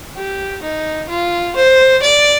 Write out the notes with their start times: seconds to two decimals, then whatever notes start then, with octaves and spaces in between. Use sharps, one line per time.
0.16 G4
0.62 D#4
1.09 F4
1.56 C5
2.02 D5